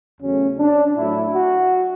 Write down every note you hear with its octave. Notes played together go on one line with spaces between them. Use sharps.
E2 C#3 F#3 A3 C#4
D4
A2 F#3 A3 E4
F#4